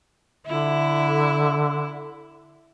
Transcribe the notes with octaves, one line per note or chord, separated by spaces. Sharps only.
D3 E4